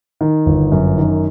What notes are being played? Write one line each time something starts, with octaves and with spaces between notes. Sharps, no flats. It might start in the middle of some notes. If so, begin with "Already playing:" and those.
D#3
G1
F#2
D#3